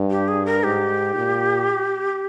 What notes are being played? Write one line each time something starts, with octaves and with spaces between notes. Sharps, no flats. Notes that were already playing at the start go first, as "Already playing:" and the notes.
Already playing: G2
G4
G#4
A#4
G#2 G4
A#2